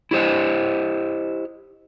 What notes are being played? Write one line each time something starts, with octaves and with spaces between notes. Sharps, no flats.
E4 G4 C5 D#5